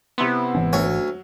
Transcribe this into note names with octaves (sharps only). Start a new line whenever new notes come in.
C3 B3 E4 C6
G#1 E3 C#4
D2 F#3 C#5